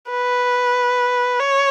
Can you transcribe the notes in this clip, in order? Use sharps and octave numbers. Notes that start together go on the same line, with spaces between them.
B4
C#5